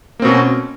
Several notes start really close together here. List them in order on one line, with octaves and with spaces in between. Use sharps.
A#3 C4 B2 C#4